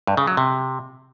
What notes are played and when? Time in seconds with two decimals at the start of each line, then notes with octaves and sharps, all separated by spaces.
0.07 G2
0.17 C#3
0.27 F#3
0.37 C3